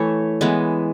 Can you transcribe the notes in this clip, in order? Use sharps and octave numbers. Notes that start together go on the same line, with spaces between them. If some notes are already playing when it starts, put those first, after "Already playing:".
Already playing: E3 A3 C#5
E3 G#3 B3